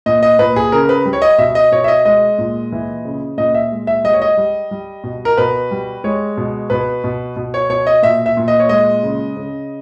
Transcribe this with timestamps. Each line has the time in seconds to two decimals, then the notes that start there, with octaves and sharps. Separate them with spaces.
0.06 A#2 D#5
0.23 D#5
0.39 A#2 B4
0.56 G#4
0.72 C#3 A#4
0.89 B4
1.06 G3
1.13 C#5
1.22 D#5
1.38 B2 E5
1.55 D#5
1.71 B2 C#5
1.84 E5
1.88 D#5
2.05 G#3 D#5
2.38 A#2
2.72 E3
3.05 C#3
3.38 A#2 D#5
3.55 E5
3.72 G#3
3.87 E5
4.04 G3 D#5
4.14 C#5
4.22 D#5
4.37 G3
4.71 G3
5.04 B2
5.25 A#4
5.37 B2 B4
5.71 G3
6.04 G#3 C#5
6.37 B2
6.70 B2 B4
7.04 B2
7.36 B2
7.54 C#5
7.70 B2 C#5
7.87 D#5
8.03 A#2 E5
8.26 E5
8.37 A#2
8.48 D#5
8.60 C#5
8.69 G#3 D#5
9.03 C#3
9.37 C#3